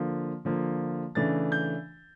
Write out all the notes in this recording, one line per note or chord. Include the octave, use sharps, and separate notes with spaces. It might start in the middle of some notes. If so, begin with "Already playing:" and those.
Already playing: D3 F3 A#3
D3 F3 A#3
C#3 E3 A3 D4 A6
G6